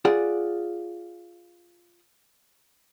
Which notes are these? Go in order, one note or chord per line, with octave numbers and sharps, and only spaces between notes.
F4 G#4 D5 F#5